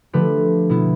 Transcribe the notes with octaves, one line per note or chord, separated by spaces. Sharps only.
D3 F3 A3 G4 B4
B2 B3 E4